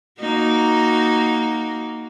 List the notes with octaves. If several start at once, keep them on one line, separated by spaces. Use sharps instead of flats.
A#3 D#4 F#4